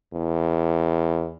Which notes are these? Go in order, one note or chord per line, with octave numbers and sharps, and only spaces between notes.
E2